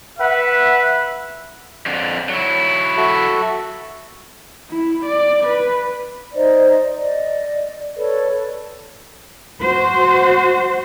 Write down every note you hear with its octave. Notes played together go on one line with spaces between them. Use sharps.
B4 E5 F#5
F2 D3
F#3 E4
F#4 A4 E5
E4
D5
B4
D#4 C5 D5 D#5
D5 D#5
A4 B4 C#5 D5
F#4 C5